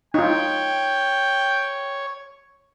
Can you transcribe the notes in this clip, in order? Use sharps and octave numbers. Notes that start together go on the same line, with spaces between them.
D#4 F4 C#5 G5